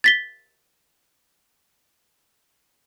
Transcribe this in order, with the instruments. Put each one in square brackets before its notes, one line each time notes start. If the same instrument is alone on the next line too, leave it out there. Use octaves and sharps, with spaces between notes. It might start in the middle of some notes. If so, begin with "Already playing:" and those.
[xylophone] A6 B6 G7